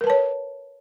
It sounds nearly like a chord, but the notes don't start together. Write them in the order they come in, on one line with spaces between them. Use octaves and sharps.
A#4 B4 A5 C#5